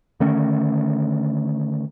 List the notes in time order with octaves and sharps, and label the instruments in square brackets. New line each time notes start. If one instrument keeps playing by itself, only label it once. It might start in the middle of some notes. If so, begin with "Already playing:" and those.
[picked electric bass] D3 D#3 A3 C#4